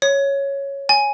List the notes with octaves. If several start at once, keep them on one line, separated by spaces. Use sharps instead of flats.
C#5
G#5